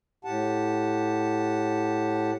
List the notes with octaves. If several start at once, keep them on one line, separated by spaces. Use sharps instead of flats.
A2 G4 F#5 A5